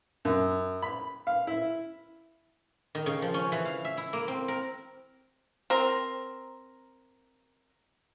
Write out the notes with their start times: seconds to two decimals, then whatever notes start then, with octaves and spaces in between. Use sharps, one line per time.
0.25 F#2
0.82 B5
1.27 F5
1.47 E4
2.95 D#3
3.06 C#3
3.22 F3
3.34 C#4
3.52 E3
3.65 F5
3.85 E5
3.97 E4
4.13 A#3
4.28 C4
4.48 A#4
5.70 C4 A#4